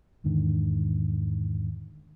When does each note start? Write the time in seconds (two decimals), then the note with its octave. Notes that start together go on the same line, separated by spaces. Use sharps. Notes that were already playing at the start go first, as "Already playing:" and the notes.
0.24 E2 G#2 D3 D#3